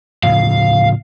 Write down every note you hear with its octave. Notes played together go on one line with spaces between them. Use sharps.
A2 C#3 F3 F5